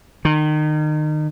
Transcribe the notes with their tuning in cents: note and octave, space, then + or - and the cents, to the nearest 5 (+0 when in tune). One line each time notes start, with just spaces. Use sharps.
D#3 -30